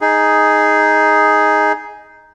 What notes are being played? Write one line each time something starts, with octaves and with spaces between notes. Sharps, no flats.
D#4 G#4